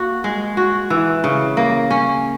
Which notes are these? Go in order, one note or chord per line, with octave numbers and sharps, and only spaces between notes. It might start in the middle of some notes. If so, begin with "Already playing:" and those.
Already playing: A#3 F#4
G#3
F#4
E3
C#3
A#3
C#4